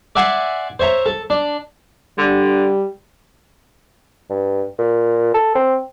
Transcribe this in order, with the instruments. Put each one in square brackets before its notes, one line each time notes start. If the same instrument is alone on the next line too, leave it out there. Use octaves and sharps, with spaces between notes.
[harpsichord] D5 E5 F#5 G#5 C6
C5 C#5 E5 A#5
A4
D4
[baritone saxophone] D3 [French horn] G3
[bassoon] G2
A#2
A4
C4